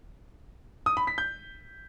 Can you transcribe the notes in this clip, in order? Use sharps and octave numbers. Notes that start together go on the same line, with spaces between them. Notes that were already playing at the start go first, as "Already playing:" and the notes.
D#6
B5
B6
G6